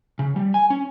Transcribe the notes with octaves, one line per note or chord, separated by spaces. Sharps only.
C#3
G3
G#5
C#4